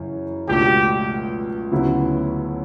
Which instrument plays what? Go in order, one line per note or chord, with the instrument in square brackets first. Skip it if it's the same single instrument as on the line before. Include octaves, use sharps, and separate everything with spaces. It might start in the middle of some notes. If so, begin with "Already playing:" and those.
Already playing: [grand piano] F#2 C#3 E3
[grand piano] C#2 B2 A3 D4 [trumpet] G4
[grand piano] D2 C#3 F#3 B3 E4